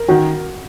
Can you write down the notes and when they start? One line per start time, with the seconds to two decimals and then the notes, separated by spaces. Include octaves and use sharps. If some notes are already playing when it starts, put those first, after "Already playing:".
Already playing: A#4
0.08 D#3 F#4